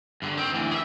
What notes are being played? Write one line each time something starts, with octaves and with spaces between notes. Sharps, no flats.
G2 D3
D#3 C4
D2 E3
G#4 E5